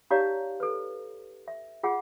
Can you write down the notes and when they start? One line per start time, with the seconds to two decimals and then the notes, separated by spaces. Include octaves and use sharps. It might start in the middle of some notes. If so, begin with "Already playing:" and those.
0.11 D#4 G4 C#5 D5 F5 A#5
0.60 A4 B4
1.48 E5
1.83 F4 G#4 F#5